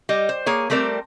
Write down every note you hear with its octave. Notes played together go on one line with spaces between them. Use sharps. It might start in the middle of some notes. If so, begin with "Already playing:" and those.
G3 D#5
C5
A#3 G#4 C#5
G3 A3 C4 A#4 D5